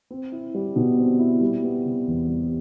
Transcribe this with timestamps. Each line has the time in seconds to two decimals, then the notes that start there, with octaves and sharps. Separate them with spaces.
0.10 C4
0.32 E4
0.55 G3
0.76 B2
0.98 C4
1.19 E4
1.41 G3
1.63 B3
1.85 C3
2.07 E2
2.28 G3